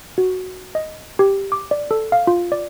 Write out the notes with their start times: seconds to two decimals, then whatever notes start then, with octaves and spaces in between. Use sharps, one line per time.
0.18 F#4
0.75 D#5
1.19 G4
1.52 D6
1.71 D5
1.91 A4
2.12 F5
2.27 F4
2.52 D5